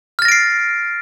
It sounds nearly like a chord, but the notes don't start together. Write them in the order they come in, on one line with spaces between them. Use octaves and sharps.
F6 A6 A#6 D7 C7